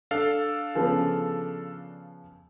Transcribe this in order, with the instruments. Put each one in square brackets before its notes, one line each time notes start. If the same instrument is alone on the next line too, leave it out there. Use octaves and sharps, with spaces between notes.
[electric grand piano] D4 A4 F5
[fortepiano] C#3 F3 B3